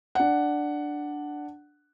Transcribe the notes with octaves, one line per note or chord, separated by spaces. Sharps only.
D4 F#5